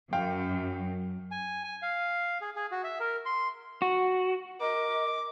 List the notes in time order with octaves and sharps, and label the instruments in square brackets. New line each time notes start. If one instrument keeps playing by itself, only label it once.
[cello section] F#2 [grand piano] F5 G5
[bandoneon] G#5
G#5
F5
G#4
G#4
F#4
E5
A#4
C6
[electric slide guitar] F#4
[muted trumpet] A#4 [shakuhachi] D#5 [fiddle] D6